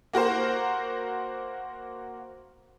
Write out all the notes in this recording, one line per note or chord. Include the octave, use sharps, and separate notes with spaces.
A#3 F#4 A#4 C5